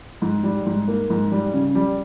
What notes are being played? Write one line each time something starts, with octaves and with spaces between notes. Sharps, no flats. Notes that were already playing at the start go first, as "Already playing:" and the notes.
G#2
G3
G#2
A#3
G#2
G3
C#3
G3